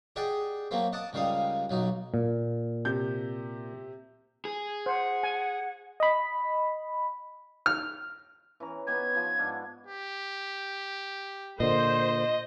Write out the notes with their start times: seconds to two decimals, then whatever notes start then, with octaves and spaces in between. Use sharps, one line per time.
0.16 G4 G#4 D5 D#5 F#5
0.71 F#3 A3 A#3 C4
0.93 D#5 F#5 A5 D6 D#6
1.13 C#2 D#3 G3 F5 D#6
1.70 B1 F#3 D#4
2.14 A#2
2.85 C3 G6
4.45 G#4
4.86 C5 F#5
5.23 G#5
6.00 D#5 B5
7.66 F6
8.60 E3 C#4 A#5
8.87 B3 D#4 G4 G#6
9.15 F3
9.39 G#2 D4 F#5
9.87 G4
11.60 A#2 D3 C5 D#5